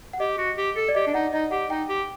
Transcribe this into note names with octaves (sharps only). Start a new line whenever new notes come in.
F#5
G4 D#5
F#4
G4
A4
D5
G4 D#5
D4
D#4 F#5
D#4 D#5
G4 F#5
D#4 G5
G4